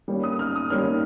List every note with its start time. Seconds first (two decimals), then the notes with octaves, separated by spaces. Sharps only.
0.08 D#3 G3 A#3 C#4
0.23 D#6
0.39 F6
0.56 D#6
0.70 D#3 G3 A#3 C#4 F6